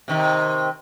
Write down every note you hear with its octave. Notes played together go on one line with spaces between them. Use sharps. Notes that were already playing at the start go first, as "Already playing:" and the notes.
C3 D#3